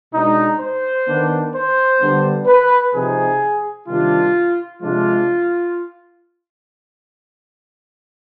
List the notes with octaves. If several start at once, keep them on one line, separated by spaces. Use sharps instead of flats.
B2 G#3 D4 D#4
C5
D#3 B3 D4
C5
D3 G3 B3 D4
B4
C3 F3 C4 D#4 G#4
C3 D#3 G3 D4 F4
C3 F3 G#3 D4 F4